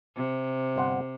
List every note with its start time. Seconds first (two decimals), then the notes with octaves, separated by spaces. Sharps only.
0.16 C3
0.76 G1 C5 F#5